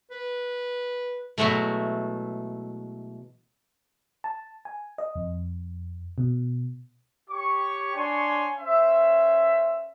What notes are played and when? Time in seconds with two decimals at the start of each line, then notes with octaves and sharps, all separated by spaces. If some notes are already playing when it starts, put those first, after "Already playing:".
0.11 B4
1.38 B2 E3 F#3 G#3 A3
4.24 A5
4.65 G#5
4.98 D#5
5.15 F2
6.18 B2
7.29 G4 C#5 C#6
7.95 D4 C#5 G#5 C6
8.58 C#4 C5 E5